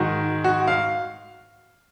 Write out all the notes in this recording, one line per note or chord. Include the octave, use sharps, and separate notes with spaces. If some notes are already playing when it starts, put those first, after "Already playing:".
Already playing: G#2 D#3 F#4
F#4
F5